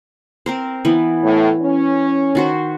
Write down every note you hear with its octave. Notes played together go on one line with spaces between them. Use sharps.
C4 A#4 C5
E3 B3
A2
C#4
D#3 F#4 C5